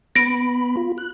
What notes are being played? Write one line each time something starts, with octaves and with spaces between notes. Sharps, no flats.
B3 B5 A#6 D7
F4
F#6